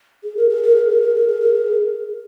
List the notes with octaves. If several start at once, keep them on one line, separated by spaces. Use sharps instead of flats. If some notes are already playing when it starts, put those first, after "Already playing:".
G#4
A#4
G#4
A#4
G#4
A#4
G#4
A#4
G#4
A#4
G#4